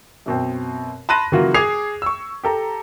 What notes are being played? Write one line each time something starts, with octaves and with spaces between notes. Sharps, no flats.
F#2 B2 C4
A5 B5 C6 F#6 A#6 D#7
C#3 E3 F#3 A#3 F4 F#4
G#4 D6 G#6 C7 F7
C#6 E6
G4 A4 A#5